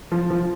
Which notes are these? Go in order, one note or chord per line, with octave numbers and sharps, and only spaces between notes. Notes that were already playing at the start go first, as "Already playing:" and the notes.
F3
F3